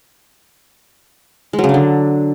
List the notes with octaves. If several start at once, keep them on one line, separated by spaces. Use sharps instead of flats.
G#3
F#3
C#3
D4
D3